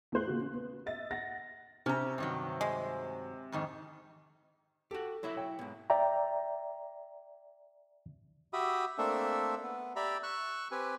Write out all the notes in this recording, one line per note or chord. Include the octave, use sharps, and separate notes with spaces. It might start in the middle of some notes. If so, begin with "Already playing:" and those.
E2 A2 E3 C5 F#6
A#2 C#3 F#4
C#4
B3
D#5 E5 A6
F#5 A6 A#6
C3 C#4 A#5
G2 D#3 F#3
G#3
F2 G#2 D#3
F#4 G4 A4
F#3 E4 E5
C#5 G5
G#2 B2
D5 E5 G5 A#5
F#4 G4 E5 B5 D#6
A3 A#3 C4 D4 A4 E5
B3
G4 D5 E5 A#5 B5
C#6 E6 F#6
C4 G4 B4 G#5